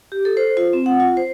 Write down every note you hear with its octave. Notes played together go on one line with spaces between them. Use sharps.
G4
A4
C5
F4
C4
F#5
F4
C5